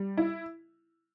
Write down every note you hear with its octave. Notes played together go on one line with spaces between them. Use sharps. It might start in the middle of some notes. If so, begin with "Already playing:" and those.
Already playing: G3
E4